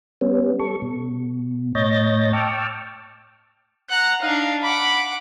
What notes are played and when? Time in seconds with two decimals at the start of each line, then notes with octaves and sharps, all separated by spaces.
0.21 G3 B3 C#4
0.59 G3 A4 C#6
0.82 B2
1.75 A2 C#5 D#5 G6 A6 A#6
2.33 G5 A5 C#6 D6 E6 F6
3.89 F#5 A#5 F#6
4.22 D4 D#4 F5
4.63 F#5 B5 D6